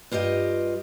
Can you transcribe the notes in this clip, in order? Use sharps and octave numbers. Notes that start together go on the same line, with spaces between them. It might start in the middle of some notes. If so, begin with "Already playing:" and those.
G2 F4 G4 D#5